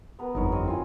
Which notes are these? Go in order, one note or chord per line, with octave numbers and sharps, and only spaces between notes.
B3 A#4 B4
G1 F2 D#4 A#4 C#5
C4 C#5 D#5
E4 F4 G#5